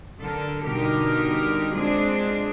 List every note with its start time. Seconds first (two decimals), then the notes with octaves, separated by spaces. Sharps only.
0.21 D3 A4 A#4
0.66 B2 D3 G3 D#4 G4 A#4
1.75 G#3 C4 D4 F4 G#4